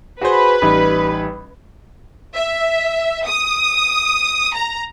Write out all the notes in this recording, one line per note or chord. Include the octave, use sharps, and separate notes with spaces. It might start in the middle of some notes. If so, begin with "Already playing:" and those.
F#4 G#4 B4 C5
A1 G3 D#4
E5
D#6
A#5